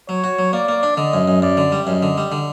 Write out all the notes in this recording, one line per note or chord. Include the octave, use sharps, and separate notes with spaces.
F#3 C#5
F#4
F#3
A#3 D5
A#3
D4
D3 D#5
F#2
F#2
F#2 D5
D3
G3
F#2 D#5
D3
G3
D3